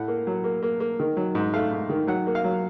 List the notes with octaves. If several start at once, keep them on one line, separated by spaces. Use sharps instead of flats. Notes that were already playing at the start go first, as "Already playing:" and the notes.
Already playing: A2 F#5
A#3
F#3
A#3
A#3
A#3
D#3
F#3
G#2
A3 F5
G#2
D#3
F#3 F#5
A#3
F5
F#3